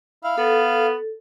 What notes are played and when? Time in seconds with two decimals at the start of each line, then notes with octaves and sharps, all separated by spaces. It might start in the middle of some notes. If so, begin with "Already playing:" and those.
0.24 E4 F5
0.38 B3 A4